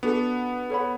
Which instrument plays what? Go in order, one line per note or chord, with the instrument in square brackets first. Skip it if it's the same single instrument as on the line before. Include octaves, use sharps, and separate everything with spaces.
[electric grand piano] B3 [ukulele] D4 F#4 A4
[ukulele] A4 C#5 F#5 B5